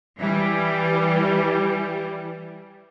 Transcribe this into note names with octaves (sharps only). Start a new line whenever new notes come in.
E3 G3